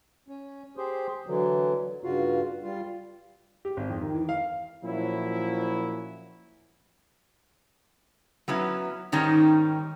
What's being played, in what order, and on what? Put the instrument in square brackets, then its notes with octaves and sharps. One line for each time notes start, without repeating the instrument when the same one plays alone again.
[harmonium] C#4
G4 G#4 C5
D3 E3 F#3
G2 C#3 F4 F#4
G3 F4
[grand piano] G4
G#1
F2
D#3
E3
F5
[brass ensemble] A#2 F3 F#3 C#4 E4
[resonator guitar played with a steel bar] F#3 B3 C#4 E4
G#2 D#3 G3 C#4 D#4